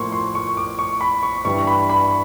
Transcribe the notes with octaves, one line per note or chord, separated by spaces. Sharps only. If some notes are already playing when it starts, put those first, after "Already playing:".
Already playing: A2 F3 A#3 C6 C#6
C6
C#6
D6
C#6
B5
C#6
G2 E3 G3 C#6
B5
B5